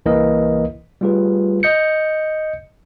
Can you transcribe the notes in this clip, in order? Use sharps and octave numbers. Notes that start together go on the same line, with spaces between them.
C2 E3 A#3 A#4 D#5
G3 A3 F4 G#4 B4
D#5 G6 C#7